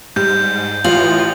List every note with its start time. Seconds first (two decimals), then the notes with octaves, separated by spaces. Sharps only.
0.16 G#2 G3 G6
0.84 A1 E3 F4 F#7